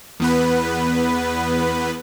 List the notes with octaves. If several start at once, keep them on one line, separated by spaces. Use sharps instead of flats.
E2 B3 B4